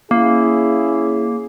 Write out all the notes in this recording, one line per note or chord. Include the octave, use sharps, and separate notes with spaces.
A#3 C#4 E4 G#4